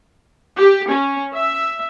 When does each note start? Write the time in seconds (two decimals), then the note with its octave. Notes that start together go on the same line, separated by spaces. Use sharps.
0.60 G4
0.92 C#4
1.35 E5